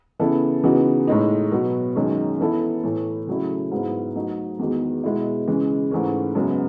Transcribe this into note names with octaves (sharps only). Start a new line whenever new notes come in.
C#3 E3 B3 E4 A4
C#3 E3 B3 D#4 F#4
A2 G#3 D#4
B2 F#3 B3
F#2 D#3 G#3 C#4
E3 B3 E4 A4
A2 E3 A3
C#3 F#3 A3 E4
G#2 F#3 B3 E4
F#3 A3 D#4 A4
E2 D#3 G#3 B3 F#4
B2 G#3 B3 E4 G#4
C#3 E3 G#3 C#4
G#2 E3 A3 C#4
F#2 C#3 G#3 B3